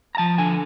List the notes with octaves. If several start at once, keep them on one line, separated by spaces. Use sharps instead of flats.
A#5
F3 A5
D3 G#5